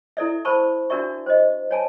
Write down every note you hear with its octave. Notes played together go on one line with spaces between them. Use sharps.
E4 A4 D5 E5
A#4 C5 A5 B5 C#6
D4 F#4 A#4 D5 E5 C#6
C5 D#5
C#5 G#5 A5